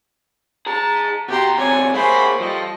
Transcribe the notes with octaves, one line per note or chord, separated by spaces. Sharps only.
G#4 A5 A#5
B2 F#4 G4 E5 G5 A#5 C6
D2 C3 C#5 D5 G#5
A#3 G#4 C5 C#5 E5 B5
F3 G3 G4 A4 D#5